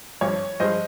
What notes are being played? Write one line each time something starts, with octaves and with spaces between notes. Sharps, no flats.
G#1 G2 F3 C#5
G2 F3 G#3 C5 D#5